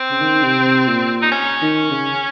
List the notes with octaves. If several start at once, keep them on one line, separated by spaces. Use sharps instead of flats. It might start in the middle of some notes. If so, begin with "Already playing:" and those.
Already playing: C4
C#3
D#3
C3
A#2
D#4
C#4
D#3
C#3